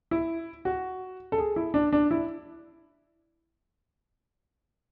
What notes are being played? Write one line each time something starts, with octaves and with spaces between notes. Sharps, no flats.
E4
F#4
A4
G#4
E4
D4
D4
E4